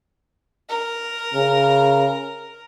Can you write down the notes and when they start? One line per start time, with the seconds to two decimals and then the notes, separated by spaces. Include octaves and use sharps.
0.69 A#4
1.34 C#3